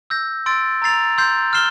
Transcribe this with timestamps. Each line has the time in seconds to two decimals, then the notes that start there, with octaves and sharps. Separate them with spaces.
0.10 E6 G6 A#6
0.46 C6 E6 A6 D7
0.82 A#5 E6 A6 C7 F7
1.18 C6 E6 G6 C7
1.53 F6 C7 E7 G7